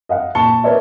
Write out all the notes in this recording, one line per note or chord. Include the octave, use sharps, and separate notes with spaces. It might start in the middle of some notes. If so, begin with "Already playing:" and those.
D#5 F5 F#5
A#2 A5 C#6 C#7 G7
B3 A#4 B4 C#5 D5 E5